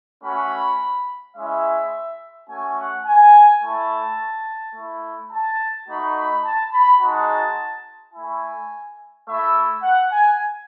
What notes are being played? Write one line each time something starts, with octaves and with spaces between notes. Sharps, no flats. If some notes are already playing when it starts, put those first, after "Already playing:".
A3 C#4 F#4 B5
G#3 C#4 E4 E5
A3 C#4 F#4 G#5
F#5
G#5
A3 E4 A5
A3 E4
A5
A3 D#4 F#4 B5
B5
A5
B5
G#3 D#4 F#4 A5
E4 G#5
A3
A3 E4 E5
F#5
G#5